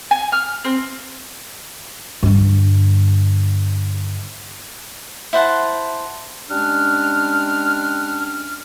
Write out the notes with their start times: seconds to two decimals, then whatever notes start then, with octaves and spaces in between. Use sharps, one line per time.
0.11 G#5
0.32 F6
0.64 C4
2.23 G2 D3
5.33 E4 C5 F#5 A5
6.50 G3 G#3 C#4 D4 F6